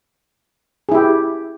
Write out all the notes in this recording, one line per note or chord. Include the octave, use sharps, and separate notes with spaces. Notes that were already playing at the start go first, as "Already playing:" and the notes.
E4 G4 G#4